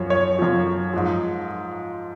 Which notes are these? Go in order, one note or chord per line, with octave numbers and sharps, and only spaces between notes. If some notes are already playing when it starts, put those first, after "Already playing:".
Already playing: F#2 F3 C#5
C#5
F#2 F3
G#2 F3